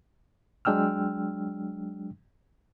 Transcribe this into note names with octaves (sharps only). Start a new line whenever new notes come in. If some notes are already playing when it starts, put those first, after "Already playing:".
F#3 G#3 D4 G5 E6 F6